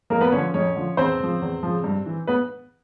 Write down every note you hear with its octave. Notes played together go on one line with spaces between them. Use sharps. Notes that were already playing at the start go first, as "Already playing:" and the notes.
F2 A#3 A#4
B3 B4
D3 F3 C#4 C#5
F2 C#4 C#5
D3 F3
E2 C4 C5
C#3 F3
E2
C#3 F3
G2
E3
B3 B4